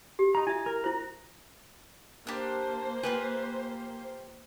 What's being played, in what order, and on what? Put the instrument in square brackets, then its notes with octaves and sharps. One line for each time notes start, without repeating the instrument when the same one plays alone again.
[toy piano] G4
[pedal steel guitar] D#4 A#5
[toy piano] E4 E5 [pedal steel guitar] G#5
[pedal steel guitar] A#4
[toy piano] E4 C5 [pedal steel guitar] A#5
[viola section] A#3 C5 [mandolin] D4 G4
[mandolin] F4 G4 G#5 [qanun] B4